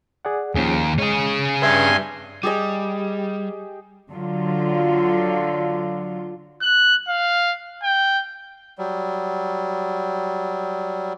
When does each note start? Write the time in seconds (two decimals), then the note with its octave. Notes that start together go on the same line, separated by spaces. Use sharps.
0.25 G#4 D5 F#5
0.55 D#2 F3 C#4 G#4
0.98 G#3 C#4 G#4
1.62 G2 B4 E5 G#5 C6
2.43 G3 G4 G#4 D#5
4.11 D3 F#3 F4
6.62 F#6
7.08 F5
7.83 G5
8.79 F#3 G3